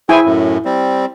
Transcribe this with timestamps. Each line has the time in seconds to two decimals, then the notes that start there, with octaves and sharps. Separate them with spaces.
0.09 E4 G#4 C5 G5 G#5
0.25 F#2 A2
0.65 G3 C4